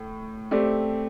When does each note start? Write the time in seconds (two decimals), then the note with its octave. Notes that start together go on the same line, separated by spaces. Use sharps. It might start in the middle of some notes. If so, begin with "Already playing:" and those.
Already playing: A2
0.51 A3 C4 G4 D5